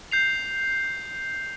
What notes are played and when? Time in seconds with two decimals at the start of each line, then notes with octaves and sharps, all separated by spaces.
0.11 G6 C7 F7